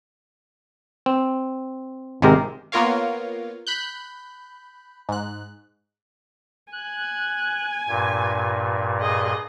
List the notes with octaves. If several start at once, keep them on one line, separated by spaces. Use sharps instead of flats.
C4
G#1 C3 G#3 C4 G4 A#4
A#3 B3 F4 A#4 C#5 F5
B5 F#6 G6
G#2 F#6
G#5 F#6
G2 A#2
G#4 D#5